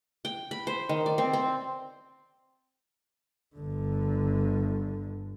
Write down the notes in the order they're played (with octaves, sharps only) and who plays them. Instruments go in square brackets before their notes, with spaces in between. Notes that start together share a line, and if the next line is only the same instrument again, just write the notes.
[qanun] G5
B5
C5
D#3
D5
C4
C4
[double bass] G1 D3